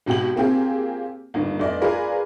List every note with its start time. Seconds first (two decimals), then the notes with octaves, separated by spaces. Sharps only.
0.06 G#1 B2 F#4 G4 F#7
0.36 A#3 C4 F4 G4 G#4
1.34 G1 D#2
1.60 F1 D5 D#5
1.81 F4 G#4 A#4 B4 D5